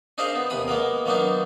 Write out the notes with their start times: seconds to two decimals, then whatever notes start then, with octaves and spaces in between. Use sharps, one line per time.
0.18 D4 D#4 G#4 A#4 C5 F5
0.36 B3
0.50 D#2 C3 B5 D#6
0.68 G#3 A#3 B3 A#4
1.06 D#3 F#3 A#3 B3 D4 D#4